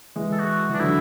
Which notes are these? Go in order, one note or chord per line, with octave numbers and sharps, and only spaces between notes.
E3 G#3
A4
F#4
E3 D4
D3 F#3 E4